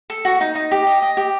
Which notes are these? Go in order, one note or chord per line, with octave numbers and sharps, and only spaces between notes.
A4
F#4
D#4
D#4
G4
D#5
D#5
G4